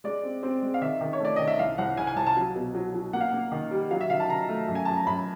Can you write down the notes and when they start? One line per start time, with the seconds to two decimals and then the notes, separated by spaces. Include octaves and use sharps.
0.04 G#3 D5
0.23 C4
0.43 C4
0.62 G#3
0.74 F5
0.82 D#3 E5
1.01 D#3
1.13 C#5
1.20 A3 D5
1.36 D#3 D#5
1.48 E5
1.59 C2 F5
1.78 C2 F#5
1.97 C2 G#5
2.07 G#5
2.16 C2 A5
2.26 A5
2.36 F#3
2.55 B2
2.75 F#3
2.94 F#3
3.13 A#3 F#5
3.21 F5
3.28 A#3 F#5
3.52 D#3
3.71 G3
3.91 F#3 F5
4.01 E5
4.10 D#3 F5
4.20 A5
4.29 D#3 A#5
4.49 A3
4.68 F#2
4.75 G#5
4.85 F#2 A5
4.96 A#5
5.07 F#2 B5